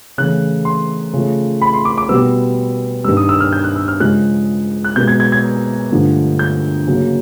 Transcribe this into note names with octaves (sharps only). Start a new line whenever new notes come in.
C#3 E3 A3 F#6
C6
C#3 F3 A3
B5
C6
D6
D6
B2 G3 B3 E6
G2 D#3 G3 E6
D#6
E6
F6
G6
F#6
E6
F6
C#3 F3 G#3 F#6
F#6
B2 G#3 B3 G6
G#6
G#6
G#6
G2 D3 F3 A3
G6
C#3 F#3 A#3